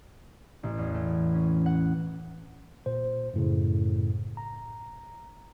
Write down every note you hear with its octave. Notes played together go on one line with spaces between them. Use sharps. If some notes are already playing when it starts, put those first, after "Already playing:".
A1
E2
A3
C#4
F#5
A#2 C5
F#2 A2 C#3
A#5